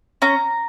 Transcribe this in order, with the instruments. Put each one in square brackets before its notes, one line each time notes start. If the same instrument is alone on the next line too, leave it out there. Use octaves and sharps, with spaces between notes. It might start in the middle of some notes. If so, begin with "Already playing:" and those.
[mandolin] C#4 A#5